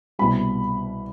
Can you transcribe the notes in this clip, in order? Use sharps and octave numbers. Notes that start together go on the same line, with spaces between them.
C2 B2 G3 B5